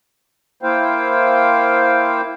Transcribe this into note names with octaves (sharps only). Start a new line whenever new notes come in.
A#3 E4 C5 F5 G5